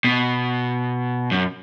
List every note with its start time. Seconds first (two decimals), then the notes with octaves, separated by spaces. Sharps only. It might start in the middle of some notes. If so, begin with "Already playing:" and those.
0.04 B2
1.32 F#2